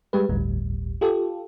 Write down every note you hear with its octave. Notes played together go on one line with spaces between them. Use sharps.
G3 G#3 G4 B4
G1 D2 A2 G3
F4 G4 A4